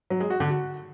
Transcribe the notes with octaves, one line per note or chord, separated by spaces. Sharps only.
F#3
G#3
F#4
D3
F#4